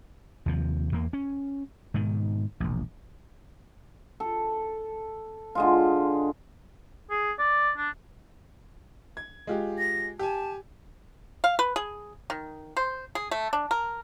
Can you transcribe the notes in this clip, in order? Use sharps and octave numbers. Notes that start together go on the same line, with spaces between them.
D#2 C3 F3
E2 A#3
C#4
G#2 B2 D#3
E1 A#1
A4
D3 G#3 F4
G#4
D5
D4
G#6
G#3 F4 G4
A#6
G4 G#5 A5
F5
B4
G#4
D#3
C5
G#4
A3
D4
A#4